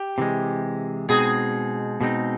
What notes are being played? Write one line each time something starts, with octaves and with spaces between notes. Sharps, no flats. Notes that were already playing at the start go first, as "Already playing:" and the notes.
Already playing: G4
C3 E3 G#3
B2 G#3 C4 D#4 G#4
B2 G#3 C4 D#4